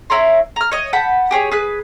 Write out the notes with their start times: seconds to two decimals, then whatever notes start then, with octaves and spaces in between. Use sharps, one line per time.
0.10 E4 C#5 A#5 C6
0.56 A#5 F6
0.72 C#5 D#5
0.93 F#5 A5 B5 G6
1.31 G4 G#4 C#5
1.51 G#4 B4 F#6